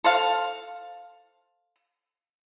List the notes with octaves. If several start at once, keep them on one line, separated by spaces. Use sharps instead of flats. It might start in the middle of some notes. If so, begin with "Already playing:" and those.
A4 C5 F5